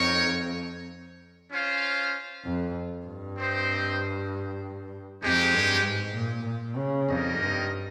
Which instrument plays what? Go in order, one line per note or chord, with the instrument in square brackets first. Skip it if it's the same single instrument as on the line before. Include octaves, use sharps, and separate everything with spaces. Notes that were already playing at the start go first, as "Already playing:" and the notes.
Already playing: [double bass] F2 [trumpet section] D#4 A#4 C#5 G5
[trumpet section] C#4 F4 C5 F5
[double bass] F2
G2
[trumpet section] C4 G4 C5 D#5
[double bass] F2 [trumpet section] G#3 D#4 G4
[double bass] G2
G#2
A#2
A#2
C#3
[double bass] F2 [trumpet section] G3 A#3 D#4 A#4 D#5
[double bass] G2